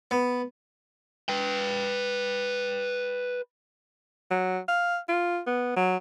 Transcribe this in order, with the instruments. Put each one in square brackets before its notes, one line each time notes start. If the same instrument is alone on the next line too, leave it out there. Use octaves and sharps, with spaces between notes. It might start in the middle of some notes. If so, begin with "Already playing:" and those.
[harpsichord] B3
[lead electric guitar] B4 G5
[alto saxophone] F#3
F5
F4
B3
F#3